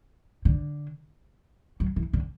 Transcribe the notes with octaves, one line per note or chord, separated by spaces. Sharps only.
D3
F#3
E3
D3